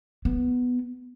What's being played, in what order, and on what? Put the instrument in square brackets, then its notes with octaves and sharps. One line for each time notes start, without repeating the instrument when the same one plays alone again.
[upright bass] B3